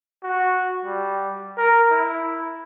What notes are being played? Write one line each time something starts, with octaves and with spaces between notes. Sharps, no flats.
F#4
G3
A#4
E4